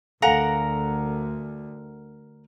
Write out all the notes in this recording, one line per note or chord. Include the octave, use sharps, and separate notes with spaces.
D2 A4 A#4 F5 F#5 G#5 A#5